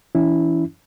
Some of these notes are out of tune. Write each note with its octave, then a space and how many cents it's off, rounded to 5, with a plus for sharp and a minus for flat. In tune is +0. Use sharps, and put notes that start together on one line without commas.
E3 +0 C#4 +30 E4 +0